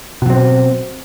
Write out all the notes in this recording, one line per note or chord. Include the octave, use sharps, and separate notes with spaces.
B2 F#3 C4